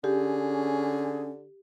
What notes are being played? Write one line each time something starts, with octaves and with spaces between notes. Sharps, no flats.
D3 C#4 G4 G#4